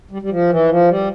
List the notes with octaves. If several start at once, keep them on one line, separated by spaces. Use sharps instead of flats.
G3
G3
F3
E3
F3
G3